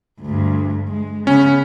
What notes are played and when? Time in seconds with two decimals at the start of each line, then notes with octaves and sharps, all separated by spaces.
0.21 D2 G2
0.88 G#3
1.27 C#3 B3 C#4